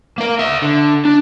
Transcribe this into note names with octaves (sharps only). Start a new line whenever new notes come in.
A#3 A#4
D5 E5
D3
D4